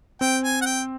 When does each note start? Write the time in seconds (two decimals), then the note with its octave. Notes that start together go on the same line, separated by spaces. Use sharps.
0.21 C4 G5
0.44 G#5
0.61 F#5
0.66 G5